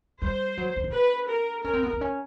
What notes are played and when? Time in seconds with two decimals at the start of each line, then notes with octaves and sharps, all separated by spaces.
0.22 G3 C5
0.57 F#3
0.76 B3
0.84 D4
0.94 B4
1.29 A#4
1.64 C#4 A#4
1.73 C4
1.83 B3
1.92 C4
2.01 C#4